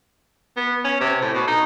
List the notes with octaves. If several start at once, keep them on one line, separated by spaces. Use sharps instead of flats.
B3
C#4
C3
A2
B2
D#4